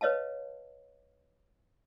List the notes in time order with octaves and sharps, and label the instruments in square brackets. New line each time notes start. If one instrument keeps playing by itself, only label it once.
[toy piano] B4 C#5 D#5 F5 A5